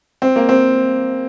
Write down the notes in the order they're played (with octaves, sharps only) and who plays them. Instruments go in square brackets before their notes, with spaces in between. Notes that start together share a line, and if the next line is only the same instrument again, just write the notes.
[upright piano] C4
A#3
C4